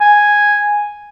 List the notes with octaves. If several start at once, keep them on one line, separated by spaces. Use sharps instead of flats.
G#5